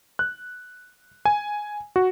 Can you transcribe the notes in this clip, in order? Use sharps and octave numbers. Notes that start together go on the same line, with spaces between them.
F#6
G#5
F#4